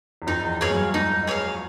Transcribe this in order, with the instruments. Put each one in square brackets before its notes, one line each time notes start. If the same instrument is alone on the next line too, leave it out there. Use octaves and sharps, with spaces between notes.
[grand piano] E2
[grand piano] F2 [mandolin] D#4
[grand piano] E2
[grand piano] F2 [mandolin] G#4 C#5 F5
[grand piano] F#2
G2
[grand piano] G#2 [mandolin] D#4
[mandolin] G#4 C#5 F5